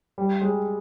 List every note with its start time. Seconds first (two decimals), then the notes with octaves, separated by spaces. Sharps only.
0.18 G3
0.41 G#3